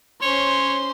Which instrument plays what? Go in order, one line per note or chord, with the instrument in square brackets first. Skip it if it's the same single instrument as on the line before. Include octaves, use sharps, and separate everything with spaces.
[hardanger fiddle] C#4 C5 [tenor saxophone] C#5 [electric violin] C6